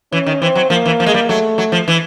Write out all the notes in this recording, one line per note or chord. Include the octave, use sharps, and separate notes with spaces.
E3 C#4
D#3
E3 C4
F#3
F3 A#3
E3
F3
G#3
G3
F#3 A3
F#3
F3
E3